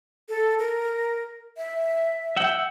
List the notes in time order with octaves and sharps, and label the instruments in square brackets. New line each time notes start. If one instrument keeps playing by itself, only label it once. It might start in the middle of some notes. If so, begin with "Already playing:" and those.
[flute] A4
A#4
E5
[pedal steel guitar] E5 F#5 G5